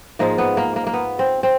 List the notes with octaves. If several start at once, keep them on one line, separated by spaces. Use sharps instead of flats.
G#2 F3 G#3 A#3
B3
A#3
A#3
A#3
B3
C4
C4